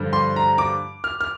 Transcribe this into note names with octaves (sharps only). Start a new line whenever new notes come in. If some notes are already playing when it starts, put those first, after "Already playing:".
Already playing: G2 D3 F3
C6
A#5
D6
F6
F6